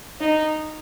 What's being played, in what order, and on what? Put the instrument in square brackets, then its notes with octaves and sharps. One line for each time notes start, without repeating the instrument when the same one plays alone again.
[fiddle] D#4